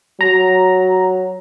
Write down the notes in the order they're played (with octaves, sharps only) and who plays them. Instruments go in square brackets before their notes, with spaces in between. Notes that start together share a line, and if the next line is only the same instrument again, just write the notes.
[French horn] F#3 [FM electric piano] A#5